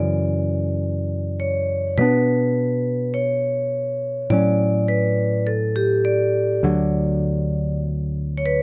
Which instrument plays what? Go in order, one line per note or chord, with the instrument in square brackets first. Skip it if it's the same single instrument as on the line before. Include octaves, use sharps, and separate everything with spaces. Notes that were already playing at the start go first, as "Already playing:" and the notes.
Already playing: [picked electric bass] F#2 C#3 E3 [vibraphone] D5
[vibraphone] C#5
[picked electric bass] B2 G3 B3 D4 [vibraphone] B4
[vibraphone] C#5
[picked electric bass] A2 F#3 C#4 [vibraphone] D5
[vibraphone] B4
A4
G4
D5
[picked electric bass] D2 D3 F#3
[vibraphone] C#5
B4